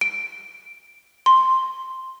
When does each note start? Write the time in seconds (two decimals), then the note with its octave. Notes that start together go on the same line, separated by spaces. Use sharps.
0.01 D7
1.26 C6